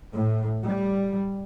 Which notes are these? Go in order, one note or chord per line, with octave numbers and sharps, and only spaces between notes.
A2
G3